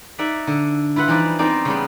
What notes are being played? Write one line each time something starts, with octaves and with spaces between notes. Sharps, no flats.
D#4 D5 E5 F#5
D3
E4 F4 B4 F#5
E3 F3 G3 D#4 D5
B3 C4 D#4 D5 D#5
C#3 G3 B3